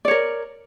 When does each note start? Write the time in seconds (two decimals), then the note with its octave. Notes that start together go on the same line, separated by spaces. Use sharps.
0.05 D5
0.08 C#5
0.11 A#4